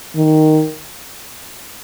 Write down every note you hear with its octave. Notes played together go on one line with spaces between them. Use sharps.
D#3